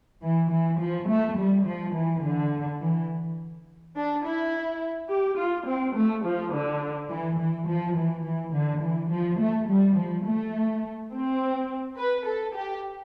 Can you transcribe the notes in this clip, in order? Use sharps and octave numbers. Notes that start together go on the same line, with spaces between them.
E3
E3
F3
A3
G3
F3
E3
D3
E3
D4
E4
G4
F4
C4
A3
F3
D3
E3
E3
F3
E3
E3
D3
E3
F3
A3
G3
F3
A3
C4
B4
A4
G4